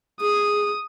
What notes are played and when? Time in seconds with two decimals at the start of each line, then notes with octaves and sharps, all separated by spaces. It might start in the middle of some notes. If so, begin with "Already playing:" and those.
0.21 G#4 D#6